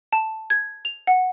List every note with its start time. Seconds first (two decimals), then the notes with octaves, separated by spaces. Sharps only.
0.13 A5
0.50 G#6
0.85 F7
1.07 F#5